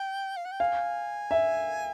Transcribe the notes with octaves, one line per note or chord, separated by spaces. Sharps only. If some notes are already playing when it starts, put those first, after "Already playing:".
Already playing: G5
F5
F#5
G5
F5 G#5
E5